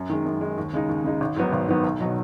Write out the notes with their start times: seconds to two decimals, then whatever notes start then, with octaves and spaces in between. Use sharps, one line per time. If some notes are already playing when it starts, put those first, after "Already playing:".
Already playing: F#2
0.09 D#3 G#3
0.26 F#2
0.41 D#3 G#3
0.58 D#2
0.73 C#3 G#3 D#4
0.89 D#2
1.04 C#3 G#3 D#4
1.21 G#1
1.36 G#2 D#3 F#3 B3
1.53 G#1
1.68 G#2 D#3 F#3 B3
1.84 B1
2.01 B2 F#3 D#4